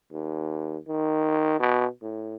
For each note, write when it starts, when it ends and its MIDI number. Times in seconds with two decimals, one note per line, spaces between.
0.12 0.78 39
0.88 1.58 51
1.60 1.86 47
2.02 2.36 45